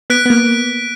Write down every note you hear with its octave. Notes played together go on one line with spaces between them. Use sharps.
B3 F#6 B6 D7
B3
A#3